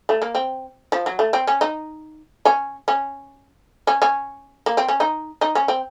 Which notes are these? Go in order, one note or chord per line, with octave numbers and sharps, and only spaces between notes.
A3
A#3
C4
F3
F#3
A3
C4
C#4
D#4
C#4
C#4
C#4
C#4
A#3
C4
C#4
D#4
D#4
C#4
C4